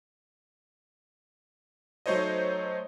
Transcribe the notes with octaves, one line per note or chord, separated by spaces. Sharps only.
F#3 A3 D#4 C5 C#5 D#5